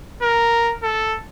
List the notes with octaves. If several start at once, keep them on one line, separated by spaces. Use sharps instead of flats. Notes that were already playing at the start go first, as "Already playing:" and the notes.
A#4
A4